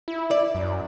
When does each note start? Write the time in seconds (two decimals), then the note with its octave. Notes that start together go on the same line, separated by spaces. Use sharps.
0.08 E4
0.31 D5
0.55 F#2